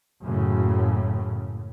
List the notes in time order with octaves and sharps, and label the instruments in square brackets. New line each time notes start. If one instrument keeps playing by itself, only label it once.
[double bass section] F#1 F#2 A2 C#3